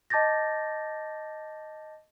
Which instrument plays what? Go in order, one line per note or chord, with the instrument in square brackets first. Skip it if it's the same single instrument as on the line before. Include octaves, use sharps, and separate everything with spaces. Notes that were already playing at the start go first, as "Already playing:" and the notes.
[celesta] D#5 A5 D6 G6 A6 A#6